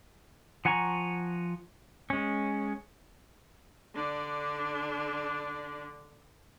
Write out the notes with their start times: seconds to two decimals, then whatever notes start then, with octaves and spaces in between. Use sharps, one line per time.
0.65 F3 F#5 G#5 A#5 C#6
2.10 G#3 C#4
3.95 D3 D4